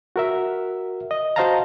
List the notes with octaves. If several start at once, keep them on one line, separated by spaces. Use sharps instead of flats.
F#4 A#4 E5
D#5
F#4 C5 D#5 F5 A5 A#5